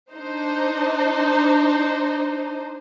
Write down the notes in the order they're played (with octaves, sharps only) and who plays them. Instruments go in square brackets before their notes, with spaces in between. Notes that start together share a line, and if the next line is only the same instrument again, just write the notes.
[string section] D4 D#4 C5